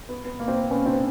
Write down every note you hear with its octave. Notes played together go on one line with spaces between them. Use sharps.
B3
B3
A#3
C4
B3
B3 C#4
C4 D4